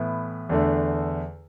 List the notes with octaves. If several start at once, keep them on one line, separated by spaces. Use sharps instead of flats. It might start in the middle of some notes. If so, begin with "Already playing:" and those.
Already playing: A2 E3 B3 E4
E2 D3 A3